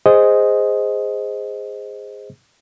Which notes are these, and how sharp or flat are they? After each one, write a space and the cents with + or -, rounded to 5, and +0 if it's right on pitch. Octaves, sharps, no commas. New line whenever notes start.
G#4 -15 C5 +0 D#5 +0